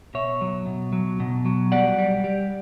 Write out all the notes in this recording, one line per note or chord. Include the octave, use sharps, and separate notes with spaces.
B2 C#5 E5
F#3
B2
F#3
B2
F#3
G3 D5 F#5
G3
G3